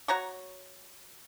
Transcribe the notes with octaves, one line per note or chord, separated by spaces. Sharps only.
F#4 C#5 A#5 C#6